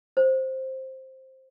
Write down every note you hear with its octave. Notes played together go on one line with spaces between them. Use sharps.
C5